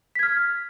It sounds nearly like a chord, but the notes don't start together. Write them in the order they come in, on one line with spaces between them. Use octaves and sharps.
B6 G#6 F6